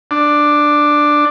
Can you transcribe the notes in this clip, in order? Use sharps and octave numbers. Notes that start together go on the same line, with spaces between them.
D4